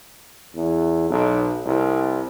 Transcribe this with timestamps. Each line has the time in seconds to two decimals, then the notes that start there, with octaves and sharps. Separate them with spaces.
0.56 E2
1.10 B1
1.66 C2